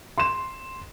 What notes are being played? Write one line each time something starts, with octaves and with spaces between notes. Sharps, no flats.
C6 E7